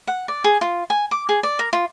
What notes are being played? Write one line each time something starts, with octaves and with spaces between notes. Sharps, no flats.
F#5
D5
G#4
F4
G#5
D6
G#4
D5
A#4
F4